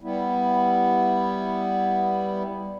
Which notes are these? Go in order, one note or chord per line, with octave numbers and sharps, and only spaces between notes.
G3 B3 E4